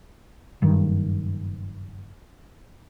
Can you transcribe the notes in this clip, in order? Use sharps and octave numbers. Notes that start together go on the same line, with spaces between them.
F#1 G2 D#3